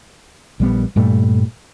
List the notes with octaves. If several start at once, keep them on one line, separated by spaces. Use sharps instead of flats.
A#1 G3 B3
G2 A#2 G3 A3